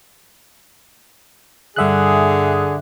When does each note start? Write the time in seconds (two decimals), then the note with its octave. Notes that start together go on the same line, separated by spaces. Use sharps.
1.76 G2 D3 G#4 E5 F#6